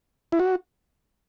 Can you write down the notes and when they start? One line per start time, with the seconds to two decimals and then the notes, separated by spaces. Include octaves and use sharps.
0.32 E4
0.39 F#4